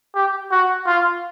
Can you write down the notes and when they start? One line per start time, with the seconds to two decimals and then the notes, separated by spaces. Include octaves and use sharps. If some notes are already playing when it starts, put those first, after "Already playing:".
0.15 G4
0.51 F#4
0.86 F4